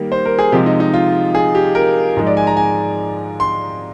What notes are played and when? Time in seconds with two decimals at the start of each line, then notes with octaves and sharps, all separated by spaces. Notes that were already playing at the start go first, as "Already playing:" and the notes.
Already playing: D#3 G3 A#3
0.12 C5
0.25 A#4
0.39 G#4
0.52 C3 F3 G#3 G4
0.66 D#4
0.80 D#4
0.94 F4
1.35 G#4
1.55 G4
1.75 A#4
2.17 G#2 F3 G#3
2.27 D5
2.37 G#5
2.47 A#5
2.57 G#5
3.40 C6